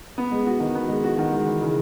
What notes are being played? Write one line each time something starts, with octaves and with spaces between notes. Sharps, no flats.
B3
G#3
F#4
D#3
B3
G#3
F#4
D#3
G#3
E3
C#3